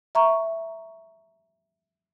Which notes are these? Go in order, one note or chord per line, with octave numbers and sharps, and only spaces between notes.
E5 A#5 C#6